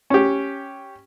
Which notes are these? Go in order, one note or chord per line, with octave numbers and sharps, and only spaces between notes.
C#4 G4